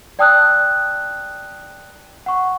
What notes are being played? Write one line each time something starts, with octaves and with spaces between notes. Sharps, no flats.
D5 G5 A5 D#6 E6 F#6
F#5 C#6